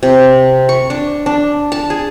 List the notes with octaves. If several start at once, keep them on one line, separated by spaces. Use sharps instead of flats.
C3
C#6
D4
D4
A5
G#4